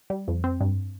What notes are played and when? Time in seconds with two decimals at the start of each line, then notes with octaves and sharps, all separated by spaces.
0.10 G3
0.28 F2
0.44 C4
0.61 G2